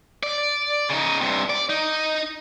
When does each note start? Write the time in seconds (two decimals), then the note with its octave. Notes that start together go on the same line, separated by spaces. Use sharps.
0.23 D5
0.90 C#3 D#4
1.21 G2 C3
1.50 D5
1.70 D#4